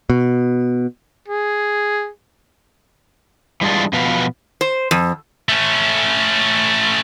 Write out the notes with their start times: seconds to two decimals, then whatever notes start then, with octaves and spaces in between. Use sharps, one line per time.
0.10 B2
1.28 G#4
3.61 E3 G3 G#3 D4 F4
3.93 B2 F3 B3 F#4 B4 F5
4.61 C5
4.91 F2
5.49 A3 C#4